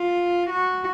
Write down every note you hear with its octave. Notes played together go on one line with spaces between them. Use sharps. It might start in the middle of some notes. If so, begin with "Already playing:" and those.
Already playing: F4
F#4